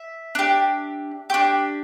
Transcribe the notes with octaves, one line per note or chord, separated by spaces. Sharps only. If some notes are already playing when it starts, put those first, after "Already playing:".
Already playing: E5
D4 G4
D4 G4